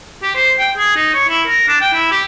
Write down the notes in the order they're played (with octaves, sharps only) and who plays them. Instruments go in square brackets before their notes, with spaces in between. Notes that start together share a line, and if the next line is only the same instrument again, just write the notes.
[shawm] G4
C5
G5
G#4
D#4
C#5
E4
A#4
D4
G5
E4
G4